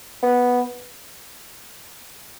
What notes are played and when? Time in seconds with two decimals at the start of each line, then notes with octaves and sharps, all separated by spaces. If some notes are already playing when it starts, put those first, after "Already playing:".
0.23 B3